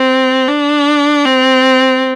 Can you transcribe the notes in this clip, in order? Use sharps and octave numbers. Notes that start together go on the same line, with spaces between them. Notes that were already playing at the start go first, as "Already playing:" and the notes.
Already playing: C4
D4
C4